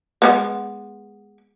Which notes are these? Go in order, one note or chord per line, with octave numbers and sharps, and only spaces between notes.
G#3 A#3 B3